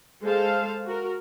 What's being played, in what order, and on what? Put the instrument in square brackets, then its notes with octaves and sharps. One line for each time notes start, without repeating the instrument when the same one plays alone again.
[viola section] G#3 A4 C5 F5 A5
F#4 A#4